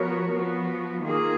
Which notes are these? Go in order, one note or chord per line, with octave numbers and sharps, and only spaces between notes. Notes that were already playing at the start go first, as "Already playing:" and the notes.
Already playing: F3 B3 F#4 A#4 C#5
F3 B3 F#4
D#3 A#3 F4 G#4